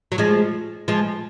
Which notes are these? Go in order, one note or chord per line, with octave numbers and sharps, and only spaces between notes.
F#3
F3 G#3
F3 G#3